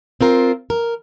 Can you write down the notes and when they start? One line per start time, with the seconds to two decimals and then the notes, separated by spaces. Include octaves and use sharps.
0.21 C4 F4 A#4
0.70 A#4